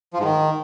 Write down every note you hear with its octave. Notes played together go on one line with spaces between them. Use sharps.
F3
G#2
D#3